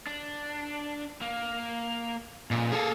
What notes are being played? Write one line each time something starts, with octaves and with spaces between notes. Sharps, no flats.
D4
A#3
F2 A#2 C#3
A#3 G#4 A4